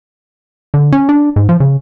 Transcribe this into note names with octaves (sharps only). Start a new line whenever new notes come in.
D3
C#4
D4
G#2
F3
C#3